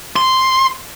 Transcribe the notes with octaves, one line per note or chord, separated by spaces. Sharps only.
C6